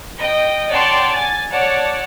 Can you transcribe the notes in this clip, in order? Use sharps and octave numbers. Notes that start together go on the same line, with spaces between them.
D#5 G5
C#5 D5 F#5 G5 A5 C6
G#5 A6
C#5 D5 F#5 A5